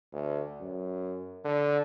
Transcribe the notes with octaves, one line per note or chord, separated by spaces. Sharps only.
D2
F#2
D3